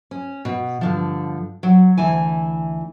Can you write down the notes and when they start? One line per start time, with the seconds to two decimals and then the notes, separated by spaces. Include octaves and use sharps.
0.11 C#4
0.45 B2
0.81 G2 D3 F3
1.63 F#3
1.98 D2 E3 E4 G#5